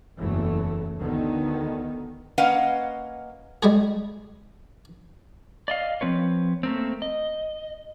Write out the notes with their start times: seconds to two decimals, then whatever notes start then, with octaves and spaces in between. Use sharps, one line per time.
0.19 F#1 E2 E3 F#3 A3
0.98 D2 D3 D#3 B3
2.38 A#3 C#4 B4 D#5 F5 F#5
3.63 G3 G#3 G#4
5.68 D5 D#5 F5
6.01 F3 C4 B4 C#5
6.63 A3 A#3 C4
7.02 D#5